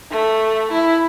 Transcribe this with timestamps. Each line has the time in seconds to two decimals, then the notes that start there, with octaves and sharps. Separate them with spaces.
0.11 A3
0.71 E4